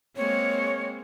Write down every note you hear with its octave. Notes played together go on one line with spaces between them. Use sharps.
G#3 A#3 C4 C#5